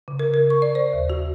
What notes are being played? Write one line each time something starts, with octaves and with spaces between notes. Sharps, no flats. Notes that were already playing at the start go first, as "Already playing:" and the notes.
C#3
A#4
A#4
C#6
D5
C5
D#2
F#4